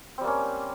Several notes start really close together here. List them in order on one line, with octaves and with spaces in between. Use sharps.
C4 G3 A#3 C#4